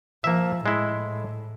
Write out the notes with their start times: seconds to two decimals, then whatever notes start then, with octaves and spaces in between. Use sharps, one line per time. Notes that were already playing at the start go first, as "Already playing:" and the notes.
0.24 F3 A#3 E5
0.66 A2 G#3 E4